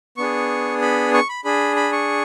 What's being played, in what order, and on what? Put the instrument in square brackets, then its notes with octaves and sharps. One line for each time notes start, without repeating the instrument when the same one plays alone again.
[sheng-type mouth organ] B3 D4 G#4 C#6
B5
C#6
B5
D4 G#4 B5
B5
C#6